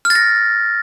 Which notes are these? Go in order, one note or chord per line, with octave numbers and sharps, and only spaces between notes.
F6
A6
A#6